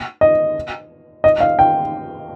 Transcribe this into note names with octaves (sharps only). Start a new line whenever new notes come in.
D#5
D#5
F5
G5